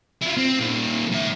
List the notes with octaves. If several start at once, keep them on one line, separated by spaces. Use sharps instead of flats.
E4 F4
C4
A#2 D#3
G#2 E5